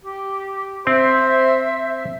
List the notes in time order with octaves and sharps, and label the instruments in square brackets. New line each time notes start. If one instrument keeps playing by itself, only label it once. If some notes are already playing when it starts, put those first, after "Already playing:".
[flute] G4
[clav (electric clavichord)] C4 [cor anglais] C5 [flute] E5